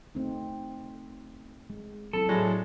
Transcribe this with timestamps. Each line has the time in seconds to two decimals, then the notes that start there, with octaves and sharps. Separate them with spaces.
0.15 A3 C4 D#4
1.70 G#3
2.13 F#3 C4 E4 A4
2.29 A2 F#3 G#3 D5